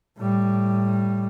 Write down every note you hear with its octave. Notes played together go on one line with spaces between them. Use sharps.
A2 G3